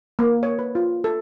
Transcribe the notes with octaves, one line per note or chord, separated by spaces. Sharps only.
A#3
C#5
B4
F4
A4